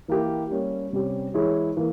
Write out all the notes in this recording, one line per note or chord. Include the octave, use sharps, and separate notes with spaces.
E3 A#3 E4 G4
G3 A#3 C#4
C3 G3 C#4 G4
E3 G#3 E4 G#4 C#5
E3 A#3